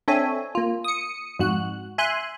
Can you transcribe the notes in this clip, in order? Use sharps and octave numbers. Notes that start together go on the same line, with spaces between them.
C4 D4 A4 C#5 E5 G#5
A#3 F4
D#6 C#7
F2 G#2 F#4 F#6
E5 G#5 C6 F#6